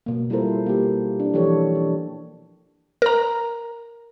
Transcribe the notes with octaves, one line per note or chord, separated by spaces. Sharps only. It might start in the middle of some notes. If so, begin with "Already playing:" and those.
B2 A#3
G3 E4 F4 A4 A#4 C5
A#3 G4
D4
E3 F3 G4 A4 C#5
D4
A#4 A#5